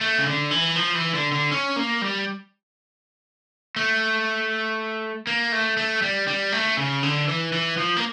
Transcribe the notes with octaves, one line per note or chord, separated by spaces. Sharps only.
A3
C#3
D3
E3
F3
E3
D3
D3
C#4
A#3
G3
A3
A#3
A3
A3
G3
G3
A3
C#3
D3
E3
E3
F3
A#3